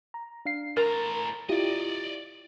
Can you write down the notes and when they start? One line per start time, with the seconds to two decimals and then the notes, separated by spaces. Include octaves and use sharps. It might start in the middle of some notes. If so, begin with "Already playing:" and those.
0.14 A#5
0.46 D4 F5 C7
0.77 A2 A#4 A#5 A6
1.49 E4 F4 G4 D5 D#5